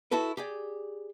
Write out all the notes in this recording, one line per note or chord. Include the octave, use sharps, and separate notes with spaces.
E4 F#4 A4 B4
G4 G#4 D5